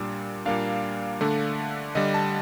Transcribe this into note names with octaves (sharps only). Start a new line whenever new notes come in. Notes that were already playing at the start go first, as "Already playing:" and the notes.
Already playing: A#2 G3 D4
A#2 G3 A#3 D4 F5
D3 A3 D4
D3 G3 D4 D#5
A5